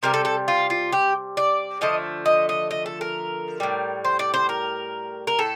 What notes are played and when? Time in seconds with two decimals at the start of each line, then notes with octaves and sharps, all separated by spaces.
0.03 C3 G3 A#4
0.14 A4
0.25 A4
0.48 F4
0.70 F4
0.92 G4
1.37 D5
1.81 D3 F3 A3 D#5
2.26 D#5
2.49 D#5
2.71 D#5
2.86 A4
3.01 A#4
3.60 A2 G3
4.05 C5
4.19 D5
4.34 C5
4.49 A#4
5.27 A#4
5.38 A2 A4